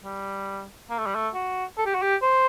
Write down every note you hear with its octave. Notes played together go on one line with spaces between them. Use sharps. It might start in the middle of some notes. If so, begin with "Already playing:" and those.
G3
A#3
A3
G3
A3
F#4
A4
G4
F#4
G4
C5